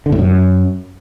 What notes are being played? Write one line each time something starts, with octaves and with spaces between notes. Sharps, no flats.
D3
A2
F#2